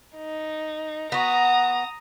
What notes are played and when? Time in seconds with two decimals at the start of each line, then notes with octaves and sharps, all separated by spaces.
0.16 D#4
1.12 B3 F#4 A#5 D#6